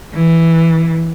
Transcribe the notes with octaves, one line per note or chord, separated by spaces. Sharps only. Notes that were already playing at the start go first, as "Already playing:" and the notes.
E3